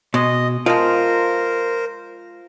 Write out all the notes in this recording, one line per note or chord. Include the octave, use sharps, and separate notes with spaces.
B2 G#3 D#5
F3 G#3 F4 A#4 C5